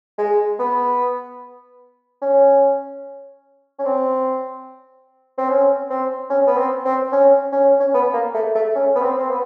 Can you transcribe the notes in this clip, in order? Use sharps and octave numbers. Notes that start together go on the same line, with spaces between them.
G#3
B3
C#4
C#4
C4
C4
C#4
C4
C#4
B3
C4
C4
C#4
C#4
C#4
B3
A#3
A3
A3
C#4
B3
C4
C4
B3